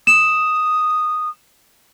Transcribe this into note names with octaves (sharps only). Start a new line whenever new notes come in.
D#6 E7